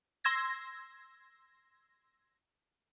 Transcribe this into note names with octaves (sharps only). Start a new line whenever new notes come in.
C6 E6 G#6 A#6